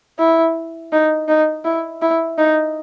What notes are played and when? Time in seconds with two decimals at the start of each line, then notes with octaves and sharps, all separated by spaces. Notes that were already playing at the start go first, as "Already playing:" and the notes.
0.19 E4
0.92 D#4
1.28 D#4
1.65 E4
2.02 E4
2.38 D#4